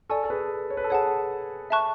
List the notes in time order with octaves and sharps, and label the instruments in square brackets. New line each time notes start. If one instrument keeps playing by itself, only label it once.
[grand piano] A4 [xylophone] D5 G#5 C#6
[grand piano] A4
G#4 B4
C#5
B4
A4
[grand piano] G#4 B4 [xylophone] C#5 F#5 A5
[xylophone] E5 A5 C#6 F#6